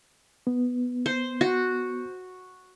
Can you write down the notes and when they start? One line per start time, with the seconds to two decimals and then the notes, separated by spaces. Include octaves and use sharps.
0.47 B3
1.06 C5
1.41 F#4